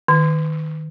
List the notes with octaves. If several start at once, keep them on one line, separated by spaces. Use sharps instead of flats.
D#3